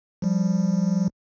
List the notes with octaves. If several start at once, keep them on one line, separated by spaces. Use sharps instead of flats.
F3 G3